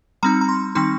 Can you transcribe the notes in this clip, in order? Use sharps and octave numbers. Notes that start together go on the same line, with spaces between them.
G3 C4 D#4 A#5
A#5
C6
D#3 G3 C4 D#4 C6